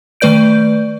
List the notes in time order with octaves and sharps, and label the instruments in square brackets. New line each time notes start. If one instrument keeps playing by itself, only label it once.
[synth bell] D#3 A3 B4 D5 G6 D7